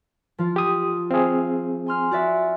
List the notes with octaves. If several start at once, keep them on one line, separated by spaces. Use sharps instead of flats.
F3 F4
G4 D#6
C4 G#4 F5
G#5 C6 F6
F#4 D5 E5